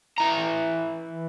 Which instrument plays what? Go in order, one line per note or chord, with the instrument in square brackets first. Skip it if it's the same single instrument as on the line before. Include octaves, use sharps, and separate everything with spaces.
[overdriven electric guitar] E3 A#5